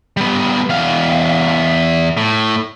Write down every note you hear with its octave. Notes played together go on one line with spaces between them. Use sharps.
G3 B3
E2 F5
A2